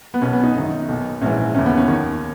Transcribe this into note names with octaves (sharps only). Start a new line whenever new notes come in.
B3
B1 B2 C#4
B3
D#4
F#1 F#2 D#3
B1 B2
A#1 G#2 E3 C#4
D#2 C#3 E3 C#4
B3
C#4
D#2 D#3 C#4